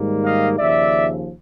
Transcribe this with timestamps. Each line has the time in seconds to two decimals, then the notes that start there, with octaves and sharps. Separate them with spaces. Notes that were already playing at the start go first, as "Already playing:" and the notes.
Already playing: G#2 D#3 G3 A#3
0.22 D#5 F5
0.58 D#2 C#3 F3 D5 E5